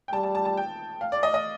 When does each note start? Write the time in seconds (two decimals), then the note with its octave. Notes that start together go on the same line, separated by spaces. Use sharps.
0.08 G5
0.13 G3 A5
0.23 A5
0.35 A5
0.45 A5
0.57 G5
1.01 F5
1.12 D5
1.23 D#5
1.34 D#5